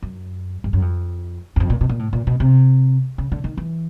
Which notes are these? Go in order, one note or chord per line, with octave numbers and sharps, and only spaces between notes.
F#2
G2
F#2
F2
E2
F2
A#2
B2
A#2
A2
A#2
B2
C3
C#3
D3
D#3
E3